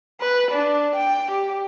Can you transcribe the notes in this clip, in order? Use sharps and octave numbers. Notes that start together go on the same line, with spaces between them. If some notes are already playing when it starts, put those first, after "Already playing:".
B4
D4
G5
G4